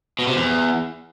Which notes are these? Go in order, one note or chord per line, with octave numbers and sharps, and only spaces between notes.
B2
C3
E2